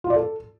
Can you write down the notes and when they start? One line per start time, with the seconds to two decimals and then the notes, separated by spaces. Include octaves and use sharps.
0.04 F4
0.10 D5
0.16 A4